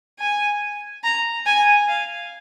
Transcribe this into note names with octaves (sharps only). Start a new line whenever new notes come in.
G#5
A#5
G#5
F5